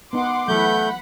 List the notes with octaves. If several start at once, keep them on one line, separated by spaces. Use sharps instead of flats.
B3 D#4 F#5 C6 D6
E3 F#3 A3 F#5 B5 G6